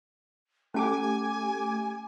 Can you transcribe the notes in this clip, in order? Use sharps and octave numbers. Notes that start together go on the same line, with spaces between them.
A3 C#4 G4 G#5 A5 D6